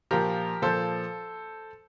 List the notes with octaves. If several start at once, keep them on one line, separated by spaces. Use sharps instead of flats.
A#2 F3 G4 A#4
A#2 F3 A4 C5